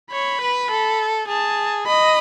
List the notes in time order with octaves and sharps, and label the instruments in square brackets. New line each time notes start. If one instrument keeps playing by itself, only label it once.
[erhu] C#5 [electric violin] B5
[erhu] B4
A4
[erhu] G#4 [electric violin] A5
[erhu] D#5 [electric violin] B5